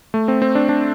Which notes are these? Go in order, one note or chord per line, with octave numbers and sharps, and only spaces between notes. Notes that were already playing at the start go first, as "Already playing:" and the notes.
A3
C4
C4
D4
D4